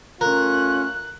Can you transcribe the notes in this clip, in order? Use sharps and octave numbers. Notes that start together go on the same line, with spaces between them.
A3 C#4 F4 A#4 F#6